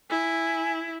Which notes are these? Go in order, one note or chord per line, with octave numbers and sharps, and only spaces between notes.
E4 G#5